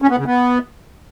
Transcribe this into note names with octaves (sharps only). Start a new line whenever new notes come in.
C#4
B3
C#3
B3